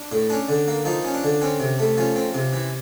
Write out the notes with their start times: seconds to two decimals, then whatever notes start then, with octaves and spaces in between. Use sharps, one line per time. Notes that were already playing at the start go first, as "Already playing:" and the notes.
Already playing: D4
0.12 A2
0.30 C#4 D4
0.49 D3
0.68 A#3
0.85 F3 D#4
1.05 C#4
1.14 D4
1.24 D3
1.42 C4 C#4
1.60 C3
1.79 A3
1.97 F3 C#4
2.16 C4
2.34 C3
2.53 E3